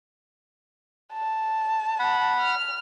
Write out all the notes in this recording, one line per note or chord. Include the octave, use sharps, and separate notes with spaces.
A5
F#5 B5
F6